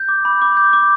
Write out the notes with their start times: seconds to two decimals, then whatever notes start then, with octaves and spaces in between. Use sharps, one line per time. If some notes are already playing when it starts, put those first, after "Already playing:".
Already playing: G6
0.09 D6
0.25 B5
0.42 D6
0.57 G6
0.73 D6